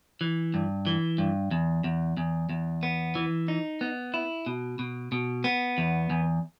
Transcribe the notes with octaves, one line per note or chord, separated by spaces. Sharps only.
E3
G2
E3
G2
E2
E2
E2
E2
B3
E3
D#4
B3
E4
B2
B2
B2
B3
E2
E2